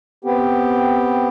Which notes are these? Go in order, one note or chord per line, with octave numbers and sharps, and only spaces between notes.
B3 C4 G4